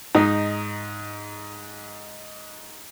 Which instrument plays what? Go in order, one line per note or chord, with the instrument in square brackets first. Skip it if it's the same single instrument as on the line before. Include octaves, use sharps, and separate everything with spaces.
[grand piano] G#2 [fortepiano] D#4